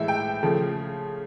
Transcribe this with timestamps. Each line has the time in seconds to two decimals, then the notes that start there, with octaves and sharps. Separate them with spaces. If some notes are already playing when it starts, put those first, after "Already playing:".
Already playing: A2 E3 G#3 E5
0.08 G5
0.43 C#3 F3 A3